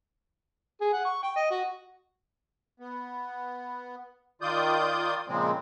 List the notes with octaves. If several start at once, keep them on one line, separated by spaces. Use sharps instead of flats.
G#4
F#5
C#6
G5
D#5
F#4
B3
D#3 F4 D5 D#6 G6
A#2 C#3 F3 G#3 C4